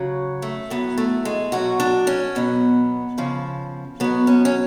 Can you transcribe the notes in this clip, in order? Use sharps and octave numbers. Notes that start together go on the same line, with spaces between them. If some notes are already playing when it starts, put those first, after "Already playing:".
Already playing: C#3 F#3
A3
A2 F#3 B3
A3
G#3
B2 F#3 F#4
D4
C#4
B2 F#3 B3
C#3 F3
B2 F#3 B3
C#4
C#4